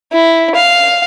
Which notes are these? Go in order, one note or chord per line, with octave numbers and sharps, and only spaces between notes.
E4
F5